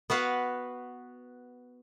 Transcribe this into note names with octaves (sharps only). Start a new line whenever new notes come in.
B3 F#4 B4 F5